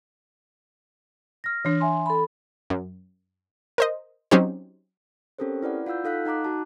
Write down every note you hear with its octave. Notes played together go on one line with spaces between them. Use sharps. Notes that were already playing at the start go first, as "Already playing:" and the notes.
F6 A#6
E3 D4
E5 G#5 C6
A4 B5
F#2
A#4 C5 D#5
F#3 C4 C#4 D#4 G4 C5
C4 C#4 G4 A4 A#4 C5
E4 B4 D5 F#5
F4 F5 F#5 E6 G6
D#4 A4 F5 F#6 B6
D#4 F#5 A#5 D6 F#6
F#4 A5